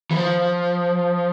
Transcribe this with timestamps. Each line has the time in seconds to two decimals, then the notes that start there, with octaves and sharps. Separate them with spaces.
0.11 E3
0.16 F3